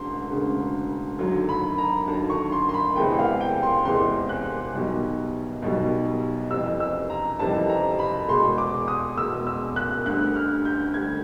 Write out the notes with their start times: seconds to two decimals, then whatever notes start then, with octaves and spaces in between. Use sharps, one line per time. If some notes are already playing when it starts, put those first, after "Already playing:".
Already playing: E1 D2 C#3 C6
0.31 E1 D2 C#3
1.19 D#2 D3 F#3
1.49 B5
1.78 A#5
2.08 D#2 D3 F#3 A5
2.30 C#6
2.52 C6
2.69 C6
2.74 B5
2.96 E2 C3 E3 G#3 G5
3.19 F5
3.41 G5
3.63 C6
3.85 E2 C3 E3 G#3 C6
4.29 F#6
4.73 B1 B2 G3
5.62 B1 B2 G3
6.51 F2 C3 E3 G3 E6
6.80 E6
7.10 A#5
7.39 F2 C3 E3 G3 A5
7.69 A#5
7.99 B5
8.29 E2 B2 G#3 C6
8.58 D6
8.88 D#6
9.17 E2 B2 G#3 E6
9.47 E6
9.76 F#6
10.06 D2 D3 G3 F#6
10.36 F6
10.65 G6
10.94 D2 D3 G3 G#6